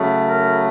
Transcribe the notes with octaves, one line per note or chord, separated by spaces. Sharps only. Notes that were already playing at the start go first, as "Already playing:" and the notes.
Already playing: C#3 F#3 A3
A#4